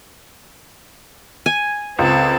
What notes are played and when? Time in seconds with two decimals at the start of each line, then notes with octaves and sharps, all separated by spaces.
1.46 G#5
1.99 C#2 C4 A4